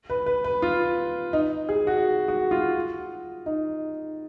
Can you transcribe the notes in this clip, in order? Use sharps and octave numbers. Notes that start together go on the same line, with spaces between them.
B4
B4
B4
F4
D#4
G#4
F#4
F#4
F4
D#4